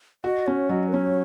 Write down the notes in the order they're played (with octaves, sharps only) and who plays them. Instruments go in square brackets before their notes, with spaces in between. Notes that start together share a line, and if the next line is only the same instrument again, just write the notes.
[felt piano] F#4 [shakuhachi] D#5
[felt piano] C#4 [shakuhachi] C#5
[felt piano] F#3 [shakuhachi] D#5
[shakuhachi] A#4
[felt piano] C#4 [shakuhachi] C#5